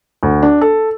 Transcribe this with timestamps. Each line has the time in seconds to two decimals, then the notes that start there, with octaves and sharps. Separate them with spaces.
0.23 D2
0.43 D4
0.61 A4